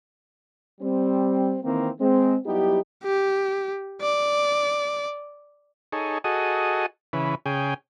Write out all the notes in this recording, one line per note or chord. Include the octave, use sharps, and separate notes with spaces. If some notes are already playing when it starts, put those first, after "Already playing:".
G3 C4
D#3 E3 A#3 C4
G#3 C4
F#3 G3 B3 D#4 E4 G4
G4
D5
D#4 G#4 A4 C#5
F#4 G#4 A4 D#5
C#3 E3 B4
C#3 G#4 G5